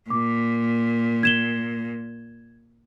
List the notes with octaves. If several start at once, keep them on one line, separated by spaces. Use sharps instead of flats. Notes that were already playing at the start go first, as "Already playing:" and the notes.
A#2 D6
G#6 E7 G7